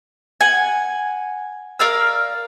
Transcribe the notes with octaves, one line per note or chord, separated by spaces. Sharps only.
F#5 G#5
A#4 D5 F5 E6